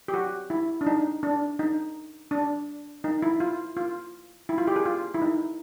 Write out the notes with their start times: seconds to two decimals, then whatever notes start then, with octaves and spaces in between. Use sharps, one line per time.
0.08 G4
0.14 F#4
0.50 E4
0.81 D4
0.87 D#4
1.23 D4
1.59 D#4
2.31 D4
3.04 D#4
3.22 E4
3.40 F4
3.76 F4
4.49 E4
4.58 F4
4.67 G4
4.76 G#4
4.85 F4
5.14 E4
5.22 D#4